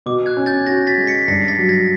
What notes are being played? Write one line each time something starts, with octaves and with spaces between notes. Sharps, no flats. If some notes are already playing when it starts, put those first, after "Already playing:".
B2 D6
F#6 G#6
C#4
G6 A6
F#4 G#6 A#6
A6 B6
G#3
B6 C#7
G2 A#6 C7
A6 B6
F#3
G#6 A#6